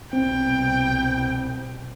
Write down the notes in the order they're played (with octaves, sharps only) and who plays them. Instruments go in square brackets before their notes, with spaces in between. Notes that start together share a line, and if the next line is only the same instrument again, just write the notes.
[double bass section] C2 B2 [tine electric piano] C4 [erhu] G5